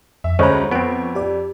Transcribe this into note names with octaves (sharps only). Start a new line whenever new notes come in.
F2 E5
D2 G#3 C#4 C5 C#5 A#5 B5 C#6
F2 B3 C4 D7
G4 D5